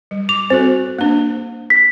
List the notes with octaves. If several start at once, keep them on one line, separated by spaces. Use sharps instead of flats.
G3
D6 F7
C4 F#4 A4 C5
A#3 D4
B6